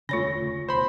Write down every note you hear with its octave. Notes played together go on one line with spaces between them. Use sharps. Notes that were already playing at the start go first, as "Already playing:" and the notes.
E1 D2 C#3 A3 F4 C#5 B5 A#6
D#2 B2 C5 B5